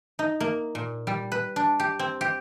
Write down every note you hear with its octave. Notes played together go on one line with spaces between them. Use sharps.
D#4
A#3
A#2
G3
B4
D4
G4
C4
G4